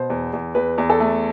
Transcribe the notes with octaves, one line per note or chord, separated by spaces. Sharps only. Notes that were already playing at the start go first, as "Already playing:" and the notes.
Already playing: B2 C5
E2
E2
E2 B4
E2
A4
A3